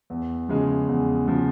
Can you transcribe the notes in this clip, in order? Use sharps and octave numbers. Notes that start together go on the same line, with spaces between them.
E2
C#3 F3 G#3
E2
C#3 F3 G#3